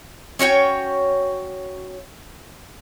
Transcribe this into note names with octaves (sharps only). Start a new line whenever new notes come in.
C#4 F#4 C#5 G5